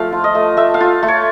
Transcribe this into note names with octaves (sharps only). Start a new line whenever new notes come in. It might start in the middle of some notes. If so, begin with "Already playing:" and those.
Already playing: F3 A3 F5
F4
D#5
A3
A3 E5
F5
F4
A3
C#5